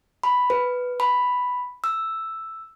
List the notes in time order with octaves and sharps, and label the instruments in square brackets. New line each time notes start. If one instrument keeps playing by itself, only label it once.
[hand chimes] B5
B4
B5
E6